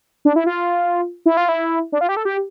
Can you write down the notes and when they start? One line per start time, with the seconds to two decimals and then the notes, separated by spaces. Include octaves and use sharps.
0.25 D4
0.36 E4
0.46 F4
1.26 E4
1.37 F4
1.49 E4
1.92 D4
2.01 F4
2.09 G4
2.17 A4
2.25 G4